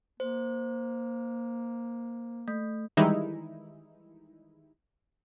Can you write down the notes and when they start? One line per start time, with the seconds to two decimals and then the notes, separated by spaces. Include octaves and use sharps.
0.20 A#3 C5
2.48 A3
2.97 D#3 E3 G3 G#3 D#4 E4